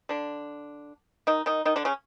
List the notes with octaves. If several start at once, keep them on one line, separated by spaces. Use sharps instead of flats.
D3 D4
D#3 D#4
D#3 D#4
D#3 D#4
D3 D4
C#3 C#4